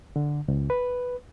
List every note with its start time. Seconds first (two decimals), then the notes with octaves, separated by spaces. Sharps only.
0.16 D3
0.48 C#2
0.70 B4